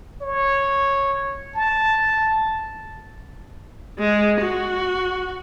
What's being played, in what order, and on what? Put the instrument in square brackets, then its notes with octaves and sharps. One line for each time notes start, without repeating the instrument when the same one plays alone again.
[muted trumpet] C#5
A5
[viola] G#3
F#4